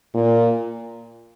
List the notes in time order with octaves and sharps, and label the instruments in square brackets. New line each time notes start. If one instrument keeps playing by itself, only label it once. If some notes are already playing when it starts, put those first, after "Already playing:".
[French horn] A#2